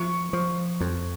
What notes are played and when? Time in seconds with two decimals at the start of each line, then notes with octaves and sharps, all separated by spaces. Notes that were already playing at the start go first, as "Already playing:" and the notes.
Already playing: F3 C#6
0.33 F3
0.81 F2